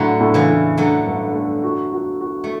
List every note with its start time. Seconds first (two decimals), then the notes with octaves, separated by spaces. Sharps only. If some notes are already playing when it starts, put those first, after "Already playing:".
Already playing: A2 D3 F#3
0.20 A2
0.34 C#3 E3
0.49 A2
0.77 D3 F#3 A3
1.06 G2
1.34 A3
1.63 F#4
1.93 F#4
2.21 F#4
2.44 A3